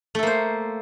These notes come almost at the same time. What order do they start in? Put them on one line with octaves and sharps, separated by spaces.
A3 A4 A#3 C5